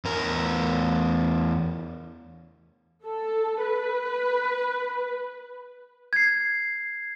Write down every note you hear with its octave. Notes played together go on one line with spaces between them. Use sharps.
E2 A#4
A4
B4
G#6 C7